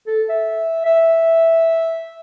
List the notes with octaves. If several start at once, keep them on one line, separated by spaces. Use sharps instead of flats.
A4
E5
E5